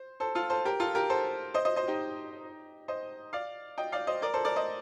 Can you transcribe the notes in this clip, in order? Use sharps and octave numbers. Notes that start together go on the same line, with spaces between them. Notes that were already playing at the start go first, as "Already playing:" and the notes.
Already playing: C5
A4 C5
F4 A4
A4 C5
G4 A#4
F4 A4
G4 A#4
A4 C5
C5 D#5
C5 D#5
C5 D#5
D#4 G4
C5 D#5
D5 F5
D#5 G5
D5 F5
C5 D#5
A#4 D5
A4 C5
A#4 D5
C5 D#5